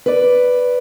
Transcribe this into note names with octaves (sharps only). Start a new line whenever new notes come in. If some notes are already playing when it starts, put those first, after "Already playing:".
B4 D5